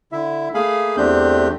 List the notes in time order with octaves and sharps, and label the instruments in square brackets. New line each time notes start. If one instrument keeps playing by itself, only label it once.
[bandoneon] D3 E4 E5
A3 A#3 G#4 F5 G#5 B5
E2 A3 C4 D4 G4 G6